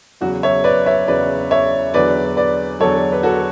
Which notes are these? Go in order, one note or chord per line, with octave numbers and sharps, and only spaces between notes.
E2 C#3 F#3 F#4
C#5 E5
B4 D5
C#5 E5
E2 C#3 F#3 B4 D5
C#5 E5
E2 D3 F#3 B4 D5
B4 D5
E2 D3 F#3 A4 C#5
B4
F#4 A4